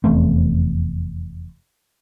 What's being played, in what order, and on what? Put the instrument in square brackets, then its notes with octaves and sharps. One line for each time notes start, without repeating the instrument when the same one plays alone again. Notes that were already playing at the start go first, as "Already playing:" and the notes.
[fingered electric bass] F1 E2 A3 C4